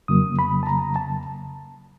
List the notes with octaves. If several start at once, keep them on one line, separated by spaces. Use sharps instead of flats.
F2 C#3 F#3 A#3 D#6
B5
A5
A#5
A5